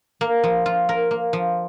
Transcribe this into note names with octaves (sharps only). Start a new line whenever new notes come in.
A#3
F3
F4
A#4
A#3
F3